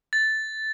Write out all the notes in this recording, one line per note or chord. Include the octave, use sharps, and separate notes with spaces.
A6